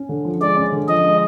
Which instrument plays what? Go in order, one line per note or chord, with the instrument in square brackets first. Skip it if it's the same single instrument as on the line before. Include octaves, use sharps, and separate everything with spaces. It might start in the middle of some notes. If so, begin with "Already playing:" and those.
Already playing: [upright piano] C#4
D3
F3
[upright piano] G#3 [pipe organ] D5
[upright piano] C#4
D3
[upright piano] F3 [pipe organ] D#5
[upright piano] G#3